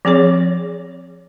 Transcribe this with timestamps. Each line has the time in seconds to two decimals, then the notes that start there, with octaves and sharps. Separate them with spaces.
0.05 F3 C4 G#4 C#5